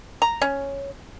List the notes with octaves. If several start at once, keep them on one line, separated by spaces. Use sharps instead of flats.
A#5
C#4